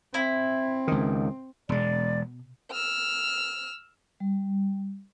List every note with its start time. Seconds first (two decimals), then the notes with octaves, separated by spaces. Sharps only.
0.14 C4 E4
0.88 C#2 D#3
1.69 E1 B2 G#3 D5
2.71 E6 F6
4.20 G3